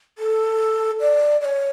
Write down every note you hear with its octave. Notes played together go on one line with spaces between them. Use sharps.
A4
D5
D5
C#5